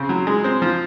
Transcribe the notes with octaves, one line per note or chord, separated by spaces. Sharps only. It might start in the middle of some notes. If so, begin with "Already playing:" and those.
Already playing: C#3 C4
F#3
G#3
C4
F3